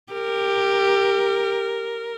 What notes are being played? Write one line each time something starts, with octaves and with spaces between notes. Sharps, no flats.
G4 A#4